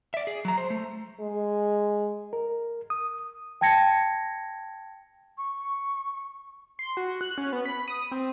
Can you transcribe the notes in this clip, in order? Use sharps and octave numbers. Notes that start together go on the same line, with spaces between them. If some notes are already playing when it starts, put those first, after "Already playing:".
D5 E5
G#4
F#3 A#5
C5
A3
G#3
A#4
D#6
G5 A5 G#6 A#6 C#7
C#6
C6
F#4
F#6
C#4
B3
B5
D#6
C4